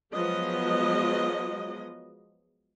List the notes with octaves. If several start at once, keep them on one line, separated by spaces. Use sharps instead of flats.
F3 F#3 G#3 B3 D#5